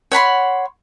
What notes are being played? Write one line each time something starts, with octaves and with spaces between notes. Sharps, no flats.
C#5 F#5 B5 C6